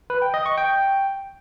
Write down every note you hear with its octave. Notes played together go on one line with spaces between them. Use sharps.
B4
G5
D#5
C#6
G5